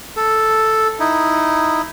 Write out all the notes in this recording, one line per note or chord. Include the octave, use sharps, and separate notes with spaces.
A4
D#4 E4